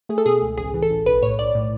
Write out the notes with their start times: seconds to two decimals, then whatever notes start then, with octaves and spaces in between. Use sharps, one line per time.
0.09 A3 G#4
0.18 A4
0.26 B2 G#4
0.42 C#2
0.57 A1 G#4
0.74 E3
0.82 A4
0.90 A1
1.06 B1 B4
1.23 A2 C#5
1.39 B1 D5
1.55 A2